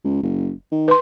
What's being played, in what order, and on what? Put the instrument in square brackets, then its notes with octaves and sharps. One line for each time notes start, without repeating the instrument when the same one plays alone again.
[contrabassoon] C#2
F#1
D#3
[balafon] B4 C6